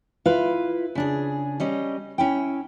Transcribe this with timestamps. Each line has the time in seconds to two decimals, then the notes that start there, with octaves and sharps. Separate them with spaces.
0.25 E4 F4 B4 F5
0.95 C#3 D4 G#4
1.60 G3 C#4 D#5
2.18 C#4 E4 G5